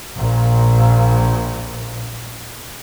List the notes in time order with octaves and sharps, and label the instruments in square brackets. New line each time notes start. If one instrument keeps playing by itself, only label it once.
[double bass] A#1 A#2